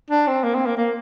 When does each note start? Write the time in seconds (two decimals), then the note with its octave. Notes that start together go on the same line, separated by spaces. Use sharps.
0.10 D4
0.27 C4
0.43 A#3
0.55 C4
0.66 A#3
0.77 A#3